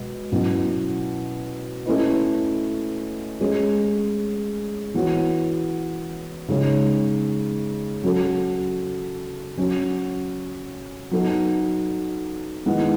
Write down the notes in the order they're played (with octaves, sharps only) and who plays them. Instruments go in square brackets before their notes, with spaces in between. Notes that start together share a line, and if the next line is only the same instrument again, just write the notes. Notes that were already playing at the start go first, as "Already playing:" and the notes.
Already playing: [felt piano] B2 G#3
B2 F#3 C#4 E4
A3 C#4 E4 B4 D#5
G#3 C#4 G#4 C#5
E3 B3 F#4 C#5
C#3 G#3 D#4 G#4 C#5
F#3 C#4 F#4 A4
F#3 C#4 F#4 C#5
F#3 B3 D#4 A4
D#3 G#3 B3 E4